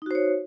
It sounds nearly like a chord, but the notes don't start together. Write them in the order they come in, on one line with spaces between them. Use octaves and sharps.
D#4 F#4 C5 C#5